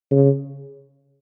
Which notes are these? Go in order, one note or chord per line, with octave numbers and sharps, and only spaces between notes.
C#3